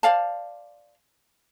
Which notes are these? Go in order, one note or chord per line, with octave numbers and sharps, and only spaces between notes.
C5 D5 F5 A5